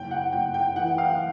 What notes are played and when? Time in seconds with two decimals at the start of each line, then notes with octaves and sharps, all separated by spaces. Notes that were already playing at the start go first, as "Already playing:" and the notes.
Already playing: F#1 G5
0.11 F#5
0.32 F#1 G5
0.54 G5
0.76 E3 F#5
0.98 F5